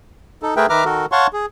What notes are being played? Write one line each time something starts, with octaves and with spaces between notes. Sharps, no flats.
D#4 A4
A3 G#4 A#4 B4 E5 G5
D#3 B4 E5 A#5 D6 F6
D#3 F#4 A4 A#4
C#5 F5 F#5 A5 C6 C#6
G#4